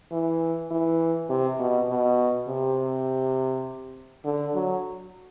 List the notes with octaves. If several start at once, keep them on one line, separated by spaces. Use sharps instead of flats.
E3
E3
C3
B2
B2
C3
D3
F#3